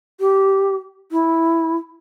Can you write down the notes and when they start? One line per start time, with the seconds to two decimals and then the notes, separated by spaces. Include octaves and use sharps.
0.20 G4
1.12 E4